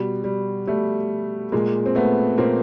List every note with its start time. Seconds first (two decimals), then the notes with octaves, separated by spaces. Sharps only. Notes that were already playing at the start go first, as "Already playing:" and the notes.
Already playing: B2 G3
0.24 G3
0.67 B2 G3 A3
1.52 A#2 G#3 A#3
1.86 C4
1.95 A3 B3
2.38 A#2 A#3 C4